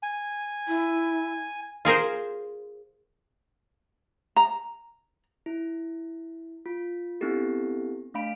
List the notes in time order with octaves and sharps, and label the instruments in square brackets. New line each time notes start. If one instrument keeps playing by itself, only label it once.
[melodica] G#5
[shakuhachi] E4
[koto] F4 G#4 A#4 C5
[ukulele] A#5
[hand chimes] E4
F4
B3 C4 D4 E4 G4 A4
A3 D4 F5 B5 D7